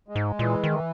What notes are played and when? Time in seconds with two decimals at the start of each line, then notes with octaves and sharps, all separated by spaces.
0.08 G#3
0.16 G#2
0.39 A#2 E3
0.64 D#3
0.70 E3